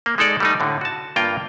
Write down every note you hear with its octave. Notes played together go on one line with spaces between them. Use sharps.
A#3
G#3 D#4 A4 D5
G3 A3 D#4
A2 D3
F#4 A5
G2 A#3 F4 G5